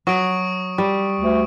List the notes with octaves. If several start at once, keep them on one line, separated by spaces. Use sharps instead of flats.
F#3 C#6 D#6 D7
G3
D2